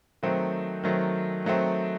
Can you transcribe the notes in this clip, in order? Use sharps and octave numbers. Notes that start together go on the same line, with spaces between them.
D#3 F#3 A3 C4
D#3 F#3 A3 C4
D#3 F#3 A3 C4